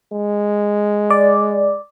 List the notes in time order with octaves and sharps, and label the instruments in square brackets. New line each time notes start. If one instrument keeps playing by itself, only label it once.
[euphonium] G#3
[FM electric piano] D5